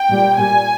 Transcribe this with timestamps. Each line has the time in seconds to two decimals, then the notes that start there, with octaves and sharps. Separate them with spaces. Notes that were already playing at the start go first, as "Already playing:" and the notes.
Already playing: G5
0.10 A#2 G3
0.38 A#2 G3 G#5